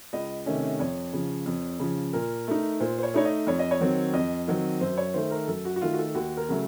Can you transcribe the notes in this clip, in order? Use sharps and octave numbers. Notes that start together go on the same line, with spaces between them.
C#2 D#5
C3 D#3 A3 C#4
F2 C#5
C#3 F3
F2
C#3 F3
A#2 A#4
A3 D#4
A#2 C5
C5
C#5
A3 D#4 C#5
D#5
F2 C#5
D#5
C#5
D#3 F#3 C4
F2 D#5
D#3 F#3 C4
F#2 C5
C#5
D#3 A3 C5
A#4
F#2 A4
F#4
F#4
D#3 A3 F4
F#4
A4
D#2 F#4
A#4
C#3 F#3 A3